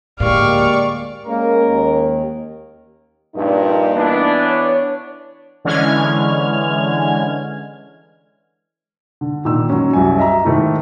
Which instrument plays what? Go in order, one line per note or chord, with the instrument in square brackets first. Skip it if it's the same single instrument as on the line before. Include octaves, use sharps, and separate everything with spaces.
[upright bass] D2 A2 [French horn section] G#3 A#3 G4 [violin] D5 C#6 [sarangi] F5
[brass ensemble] G#3 C#4 A#4 [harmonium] A#3
[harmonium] D#2
[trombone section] A#1 [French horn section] G2 A#2 D#4
[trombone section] E3 B3 D4
[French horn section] C#5
[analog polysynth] D3 E3 G#3 C#4 F6 G#6
[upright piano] D3
A#2 D#3 E6
F#3 C#4
C2 F#2 G#5
D#5 E5 A#5
G#2 D#3 A3 E4